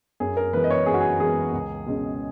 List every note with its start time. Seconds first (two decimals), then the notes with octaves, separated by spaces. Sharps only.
0.20 F#2 G#4
0.37 A#4
0.53 E3 G#3 B3 B4
0.64 D#5
0.71 C#5
0.86 F#2 G#4
0.94 F#4
1.01 G#4
1.20 E3 G#3 B3 G#4
1.53 C#2
1.86 B2 G#3 C#4